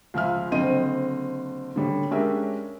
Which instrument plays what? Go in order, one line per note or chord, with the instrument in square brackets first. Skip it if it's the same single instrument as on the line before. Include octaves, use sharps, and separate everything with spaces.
[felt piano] C#2 F3 E5 F6
F#1 D3 C4 D#5 D#7
D3 G3 C#5
G#3 C#4 D4 G4 A#4 E5